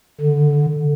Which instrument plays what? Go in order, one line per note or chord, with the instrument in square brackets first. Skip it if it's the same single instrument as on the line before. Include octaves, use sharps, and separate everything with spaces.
[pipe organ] D3